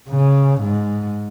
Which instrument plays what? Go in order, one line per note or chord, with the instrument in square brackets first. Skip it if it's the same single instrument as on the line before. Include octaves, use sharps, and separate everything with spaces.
[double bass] C#3
G#2